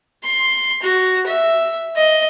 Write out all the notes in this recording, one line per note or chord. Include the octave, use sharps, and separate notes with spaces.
C6
F#4
E5
D#5